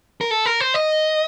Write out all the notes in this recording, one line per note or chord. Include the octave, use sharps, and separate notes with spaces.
A#4
A4
A#4
C5
D#5